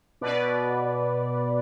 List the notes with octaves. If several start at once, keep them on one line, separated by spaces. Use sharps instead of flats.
B2 B4 D5